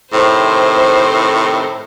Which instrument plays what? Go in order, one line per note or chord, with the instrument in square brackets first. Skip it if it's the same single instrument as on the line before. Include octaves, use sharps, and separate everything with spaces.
[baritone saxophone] A2 [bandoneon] C3 D#3 C4 [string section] C5